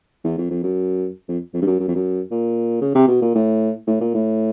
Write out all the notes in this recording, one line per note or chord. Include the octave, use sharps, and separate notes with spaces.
E2
F2
F2
F#2
F2
F2
G2
F#2
F#2
F2
F#2
A#2
C#3
C3
B2
A#2
A2
A2
A#2
A2